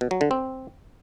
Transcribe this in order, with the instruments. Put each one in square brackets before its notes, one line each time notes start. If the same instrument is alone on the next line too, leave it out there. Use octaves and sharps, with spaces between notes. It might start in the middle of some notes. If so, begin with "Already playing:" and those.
[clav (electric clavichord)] B2
F#3
D3
C4